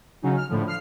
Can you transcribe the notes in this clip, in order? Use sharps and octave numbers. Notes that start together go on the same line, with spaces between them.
C#3 F#3 C#4 D#4
F6
A2 D3 F3
F3 F6 C7